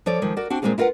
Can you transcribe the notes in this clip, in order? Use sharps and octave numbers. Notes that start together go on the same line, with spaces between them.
F3 A4 C#5 D5
D#3 F3 G#3
F#4 A#4 D5
C4 D4 F#4
A#2 F#3 G#3 C4 F4 G#4
E4 F4 A#4 B4 F#5